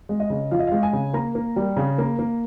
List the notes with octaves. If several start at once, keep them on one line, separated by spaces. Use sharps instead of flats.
G#3
D#5
C#3
F3 F5
D#5
G#3 F5
G#5
C#3
A#3 A#5
A#3
G3
C#3
A#3
A#3